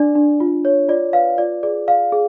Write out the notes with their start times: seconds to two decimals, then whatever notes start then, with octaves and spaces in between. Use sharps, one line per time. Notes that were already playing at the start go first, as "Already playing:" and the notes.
Already playing: D4 D5
0.15 D4
0.40 F4
0.65 C#5
0.89 F4 D5
1.13 B4 F5
1.38 F4 D5
1.63 G#4 D5
1.87 D5 F5
2.12 G#4